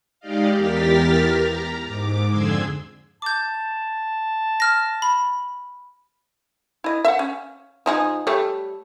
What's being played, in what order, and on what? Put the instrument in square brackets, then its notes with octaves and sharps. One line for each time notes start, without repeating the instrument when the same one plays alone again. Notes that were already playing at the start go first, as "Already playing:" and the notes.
[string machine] G#3 D#4 G4 D5 D#5 F5
E2 G4 A#4 F6 A6 B6
A#5
G#2 D6
F2 D3 G#4 C6 E6 G#6
[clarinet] A5 [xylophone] D6 G6
[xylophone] F6 A#6
B5
[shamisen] E4 D#5
E5 F#5
C#4
F3 D#4 G#4
G3 A3 C#5